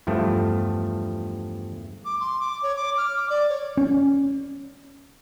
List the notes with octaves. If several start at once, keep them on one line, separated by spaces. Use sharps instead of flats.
E2 G2 F3 A3
D6
C6
D6
C#5
D6
F6
D6
D5
C#5
C#4